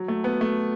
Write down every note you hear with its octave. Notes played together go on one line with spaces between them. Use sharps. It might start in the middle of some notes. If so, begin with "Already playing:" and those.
Already playing: F#3
A3
B3
A3